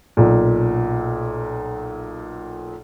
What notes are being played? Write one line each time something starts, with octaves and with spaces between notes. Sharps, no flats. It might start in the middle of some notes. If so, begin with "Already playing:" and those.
B1 A#2